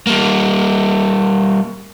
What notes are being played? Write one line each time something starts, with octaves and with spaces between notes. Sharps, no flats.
G3 A#3